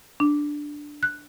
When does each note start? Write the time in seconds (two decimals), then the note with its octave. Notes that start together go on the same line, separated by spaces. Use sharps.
0.20 D4
1.03 F#6